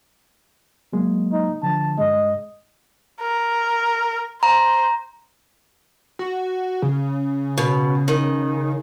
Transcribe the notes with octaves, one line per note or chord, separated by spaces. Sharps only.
F#3 G#3 A#3
D#4
D3 F3 A5
G2 G#3 D#5
A#4
C5 A#5
F#4
C#3
B2
D#3